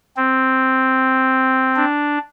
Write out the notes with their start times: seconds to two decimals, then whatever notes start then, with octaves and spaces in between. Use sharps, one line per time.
0.17 C4
1.76 D4